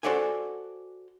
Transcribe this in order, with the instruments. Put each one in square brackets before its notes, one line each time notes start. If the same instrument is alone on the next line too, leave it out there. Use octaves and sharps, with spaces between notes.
[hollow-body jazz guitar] F#4 A4 C5 D5 F#5 G#5